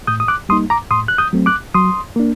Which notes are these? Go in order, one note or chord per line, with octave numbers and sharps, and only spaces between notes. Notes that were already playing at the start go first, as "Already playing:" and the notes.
A2 D#6 G6
D#6
D6 F#6
G3 A#3 D#4 C6 D#6
A#5 D6
A2 C6 D#6
F#6
D#6 G6
F#3 A3 C4
D6 F#6
F#3 C6 D#6
A#3 D4